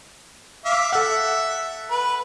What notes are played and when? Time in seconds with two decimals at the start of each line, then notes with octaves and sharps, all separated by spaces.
0.65 E5 F5 D6
0.93 A4 E5 F#5
1.91 B4